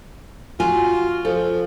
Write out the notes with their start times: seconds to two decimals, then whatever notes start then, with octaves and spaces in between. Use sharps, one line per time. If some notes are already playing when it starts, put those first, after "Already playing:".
0.60 F4 F#4 G#5
1.25 F3 A4